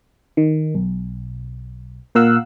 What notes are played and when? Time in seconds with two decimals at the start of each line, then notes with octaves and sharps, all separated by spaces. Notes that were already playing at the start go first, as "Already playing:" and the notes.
0.37 D#3
0.75 B1
2.15 A#2 A#4 F5 F#5 E6 F#6